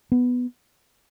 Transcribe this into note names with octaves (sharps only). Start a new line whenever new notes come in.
B3